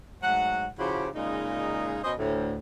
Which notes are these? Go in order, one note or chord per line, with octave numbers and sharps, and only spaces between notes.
G#2 F#3 A3 F#5
C#3 F3 E4 F#4 G4 C5
A#2 C#3 G#3 D#4
B2 C#4 C5 D#5
D2 A2